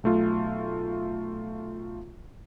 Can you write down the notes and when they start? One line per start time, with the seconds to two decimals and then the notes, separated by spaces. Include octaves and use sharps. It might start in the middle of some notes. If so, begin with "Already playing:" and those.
0.03 B1 A3 F4